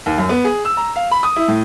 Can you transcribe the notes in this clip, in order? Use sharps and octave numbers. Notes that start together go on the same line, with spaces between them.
D#2
F#2
B3
G#4
E6
A#5
F5
B5
D#6
E4
A2